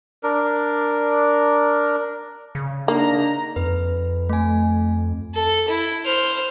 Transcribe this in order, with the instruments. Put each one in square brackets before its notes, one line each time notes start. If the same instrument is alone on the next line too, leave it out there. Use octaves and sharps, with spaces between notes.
[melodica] D4 A#4
[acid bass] C#3
[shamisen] A#3 [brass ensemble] D4 D#4 A#5
[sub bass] F2 [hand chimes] B4
[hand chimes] A3 G#5
[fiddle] A4
E4
C5 F6